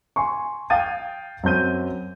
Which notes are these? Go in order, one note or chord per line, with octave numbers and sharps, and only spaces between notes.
G#5 C6 C#6
F5 G5 D#6 G#6 A6 D#7
F#2 C4 G6 D#7